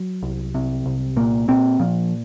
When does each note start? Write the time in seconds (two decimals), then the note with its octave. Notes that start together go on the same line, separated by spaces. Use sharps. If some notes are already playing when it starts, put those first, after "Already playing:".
Already playing: F#3
0.23 C2
0.54 C3
0.86 C2
1.16 A#2 A#3
1.48 A#2 C4
1.79 A#2 F3